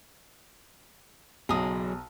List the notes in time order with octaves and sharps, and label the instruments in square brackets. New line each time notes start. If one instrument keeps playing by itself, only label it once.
[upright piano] B1 [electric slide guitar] F#3 G#4 [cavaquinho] A#5 D#6